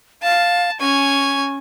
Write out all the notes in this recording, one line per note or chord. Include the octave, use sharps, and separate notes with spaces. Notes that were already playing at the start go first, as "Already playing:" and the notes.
F5 A5
C#4 G#5 C#6